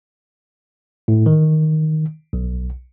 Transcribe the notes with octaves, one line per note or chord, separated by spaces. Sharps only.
A2
D#3
B1